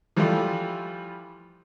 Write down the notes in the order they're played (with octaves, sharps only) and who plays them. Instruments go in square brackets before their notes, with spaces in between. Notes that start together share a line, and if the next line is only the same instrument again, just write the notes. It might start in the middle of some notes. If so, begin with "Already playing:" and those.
[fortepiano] E3 F3 G3 A3 E4 F4